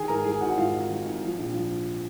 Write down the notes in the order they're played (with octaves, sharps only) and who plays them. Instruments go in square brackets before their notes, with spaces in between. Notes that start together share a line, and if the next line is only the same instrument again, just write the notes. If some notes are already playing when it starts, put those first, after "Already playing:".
Already playing: [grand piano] D#3 G#4 G#5
G#2 A#4 A#5
D#3 G#4 G#5
G#1 F#4 F#5
G#2 F4 F5
G#1
D#3
G#1
F3
A#1
F3